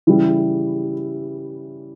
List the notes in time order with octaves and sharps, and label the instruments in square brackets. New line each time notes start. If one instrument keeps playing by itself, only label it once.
[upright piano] C#3 E3 G3 E4